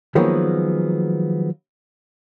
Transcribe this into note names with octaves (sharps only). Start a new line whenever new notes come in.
D#3 F3 F#3 G#3 A#3 B3